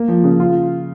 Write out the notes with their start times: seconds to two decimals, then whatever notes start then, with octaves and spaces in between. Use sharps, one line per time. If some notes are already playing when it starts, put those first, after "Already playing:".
Already playing: A#3
0.08 F3
0.24 C#3
0.40 F4